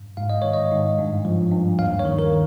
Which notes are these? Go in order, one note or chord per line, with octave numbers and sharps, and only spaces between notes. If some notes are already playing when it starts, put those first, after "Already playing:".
Already playing: G2
G#2 F5
D#5
D#3 C#5
D#5
G#2
G2
F3
G2
D#2 F5
C#5
D#3
A#4